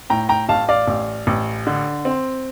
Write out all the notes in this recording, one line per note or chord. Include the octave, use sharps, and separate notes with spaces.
A2 G5 A#5
G5 A#5
A1 F5 A5
D5 F5
A1
A1
D3
C4